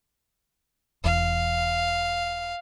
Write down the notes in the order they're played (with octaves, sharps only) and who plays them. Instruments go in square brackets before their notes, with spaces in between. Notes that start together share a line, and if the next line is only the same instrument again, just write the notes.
[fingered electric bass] E1 E2 [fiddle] F5